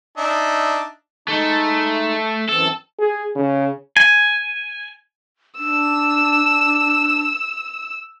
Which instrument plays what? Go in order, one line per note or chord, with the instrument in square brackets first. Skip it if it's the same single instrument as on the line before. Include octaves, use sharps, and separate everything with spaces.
[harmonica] D4 D#4 E5
[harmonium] G#3 D#4 [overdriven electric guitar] A3
[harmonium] F#2 E3 C4 [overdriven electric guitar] A4
[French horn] G#4
C#3
[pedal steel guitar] G#5
[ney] D4 [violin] E6